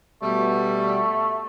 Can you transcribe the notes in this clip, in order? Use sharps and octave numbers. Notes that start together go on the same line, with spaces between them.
B2 G3 A3